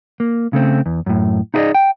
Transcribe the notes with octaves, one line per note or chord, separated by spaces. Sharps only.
A#3
C#3 A3 C4
E2
F#2 A2
D#4 E4 G#4 B4 D5 D#5
G5